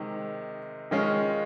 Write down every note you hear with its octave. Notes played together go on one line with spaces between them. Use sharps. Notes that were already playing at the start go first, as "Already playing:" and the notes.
Already playing: C3 D#3 G#3
D#3 G#3 C#4 F4